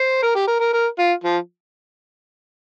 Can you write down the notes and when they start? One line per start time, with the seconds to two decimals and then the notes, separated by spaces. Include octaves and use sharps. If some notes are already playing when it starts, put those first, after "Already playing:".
Already playing: C5
0.22 A#4
0.35 G4
0.48 A#4
0.60 A#4
0.73 A#4
0.99 F4
1.24 F3